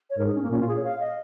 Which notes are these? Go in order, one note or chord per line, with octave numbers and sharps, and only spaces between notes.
C#5
G#2 A#4
D#4
C#4
A#3
A#2 C#4
F4
G#4
C#5
F5
D#5